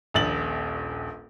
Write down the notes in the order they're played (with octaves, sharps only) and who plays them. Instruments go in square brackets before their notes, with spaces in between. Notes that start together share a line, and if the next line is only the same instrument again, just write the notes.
[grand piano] D#1 A#1 A6 F#7